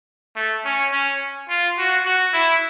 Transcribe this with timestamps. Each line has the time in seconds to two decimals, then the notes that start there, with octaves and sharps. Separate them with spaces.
0.36 A3
0.65 C#4
0.92 C#4
1.49 F4
1.78 F#4
2.05 F#4
2.34 E4